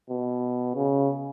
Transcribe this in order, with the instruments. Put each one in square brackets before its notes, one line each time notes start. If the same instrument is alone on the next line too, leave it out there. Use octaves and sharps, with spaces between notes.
[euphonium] B2
C#3